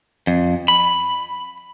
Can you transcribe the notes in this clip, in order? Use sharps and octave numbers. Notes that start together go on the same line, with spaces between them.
F2
B5